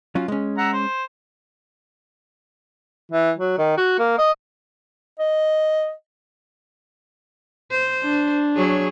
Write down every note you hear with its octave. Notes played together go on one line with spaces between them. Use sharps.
F#3 C#4 F4
G#3 C#4
E5 F#5 A#5
C5
E3
F#3
D#3
F#4
A#3
D#5
D#5
C5
D4
F#3 G#4 C#5